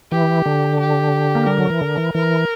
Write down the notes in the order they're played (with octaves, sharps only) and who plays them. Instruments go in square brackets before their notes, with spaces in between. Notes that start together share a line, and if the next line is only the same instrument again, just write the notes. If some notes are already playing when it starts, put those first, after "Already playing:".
[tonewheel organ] E3 [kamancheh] G4
[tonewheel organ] D3
[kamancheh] G4
[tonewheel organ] A#3
[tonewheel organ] G3 [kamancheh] A#4
[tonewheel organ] F#3
E3
D3
E3
[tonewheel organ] E3 [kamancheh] A#4